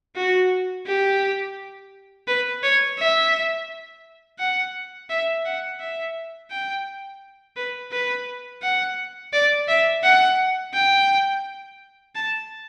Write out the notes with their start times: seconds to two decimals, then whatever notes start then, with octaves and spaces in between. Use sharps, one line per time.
0.16 F#4
0.87 G4
2.28 B4
2.63 C#5
2.99 E5
4.39 F#5
5.10 E5
5.45 F#5
5.80 E5
6.51 G5
7.56 B4
7.92 B4
8.62 F#5
9.33 D5
9.68 E5
10.03 F#5
10.74 G5
12.15 A5